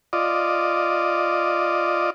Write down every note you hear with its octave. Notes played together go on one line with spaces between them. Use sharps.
F4 D5 D#5